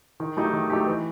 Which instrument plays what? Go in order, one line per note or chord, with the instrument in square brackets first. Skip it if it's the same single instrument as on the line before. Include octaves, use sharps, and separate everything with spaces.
[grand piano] D#3
F#3 A3 D#4 G4
D#3
F#3 A3 D#4 G4
E3